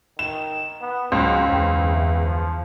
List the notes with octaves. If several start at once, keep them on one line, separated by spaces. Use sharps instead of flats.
D#3 E7
B3
C#2 F#3 C4
G1 E2 C4
E3
F3